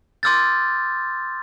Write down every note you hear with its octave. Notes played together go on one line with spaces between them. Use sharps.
C6 D6 E6 F6 G6 A6